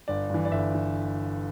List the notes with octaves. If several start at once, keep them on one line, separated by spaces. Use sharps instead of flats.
G1 D5
G2 E3
D5
G1 E5
E3